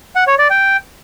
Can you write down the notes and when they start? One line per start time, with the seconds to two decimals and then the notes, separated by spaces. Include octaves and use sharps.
0.16 F#5
0.27 C#5
0.39 D5
0.50 G5